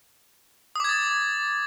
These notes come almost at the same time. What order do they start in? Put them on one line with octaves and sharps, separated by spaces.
D#6 D6 G#6 A6